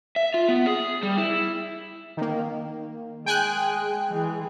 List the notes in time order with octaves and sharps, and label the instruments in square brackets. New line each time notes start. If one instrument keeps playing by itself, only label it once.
[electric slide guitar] E5
F4
B3
G#4
G3
E4
[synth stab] D#3 A#3
[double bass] G#3 [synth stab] G5 G#5 F#6
[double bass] E3 G#3